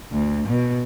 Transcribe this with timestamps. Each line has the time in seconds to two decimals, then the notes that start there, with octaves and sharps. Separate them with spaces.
0.12 D2
0.49 B2